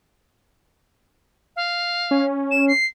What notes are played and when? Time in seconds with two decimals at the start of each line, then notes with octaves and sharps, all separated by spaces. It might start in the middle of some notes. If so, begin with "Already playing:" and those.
1.56 F5
2.11 C#4
2.51 E7
2.68 C7